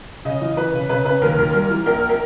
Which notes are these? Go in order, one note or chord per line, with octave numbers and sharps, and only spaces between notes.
C#3 D#5
E3
E3 B4
C#3
C#3 B4
C#3 B4
D#2 A#4
D#2 A#4
G3 A#4
E3
A#1 A#4
A#4